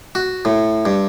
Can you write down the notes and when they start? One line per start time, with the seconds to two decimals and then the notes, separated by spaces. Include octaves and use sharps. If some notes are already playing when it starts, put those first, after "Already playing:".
0.15 F#4
0.45 A2
0.85 G2